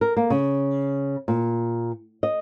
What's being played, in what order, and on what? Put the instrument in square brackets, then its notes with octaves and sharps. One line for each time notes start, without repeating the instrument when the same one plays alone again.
[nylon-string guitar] A#4
A#3
C#3
A#2
D#5